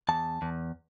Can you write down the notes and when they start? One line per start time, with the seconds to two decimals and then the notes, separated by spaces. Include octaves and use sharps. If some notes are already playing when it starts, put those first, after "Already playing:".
0.09 E2 A5
0.42 E2